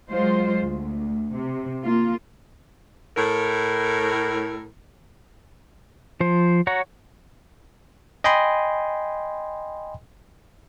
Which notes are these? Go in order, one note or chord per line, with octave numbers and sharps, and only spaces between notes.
F#3 G#3 F4 C5
D2
C3
A#3 F4
A2 A#4
F3 C5
F#4 C#5 F#5 A#5
D#5 G5 G#5 B5 C6